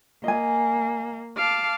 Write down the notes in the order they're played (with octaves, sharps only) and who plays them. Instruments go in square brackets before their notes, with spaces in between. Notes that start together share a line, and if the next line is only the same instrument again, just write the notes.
[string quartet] A#3 [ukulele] D#5 G#5
[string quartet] F5 A5 D6